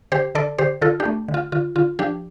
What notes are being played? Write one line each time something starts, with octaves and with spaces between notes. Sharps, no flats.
D3 G4 C5
D3 A4 D5
D3 G4 C5
D3 F4 A4
D4 G4
A3
D3
F4
D3 F4
D3 F4
F3 D4 G4